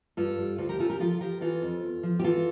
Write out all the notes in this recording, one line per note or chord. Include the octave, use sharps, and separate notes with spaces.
G2 F4 A4
G3
D2 F4 A4
G4 A#4
C#3 F4 A4
G4 A#4
F3 F4 A4
F3 G4 A#4
E3 F4 A4
F2
E2
F3
G4
E3 F4 A4